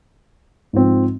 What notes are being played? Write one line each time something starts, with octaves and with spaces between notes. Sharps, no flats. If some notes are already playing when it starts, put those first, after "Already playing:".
G#2 F3 C4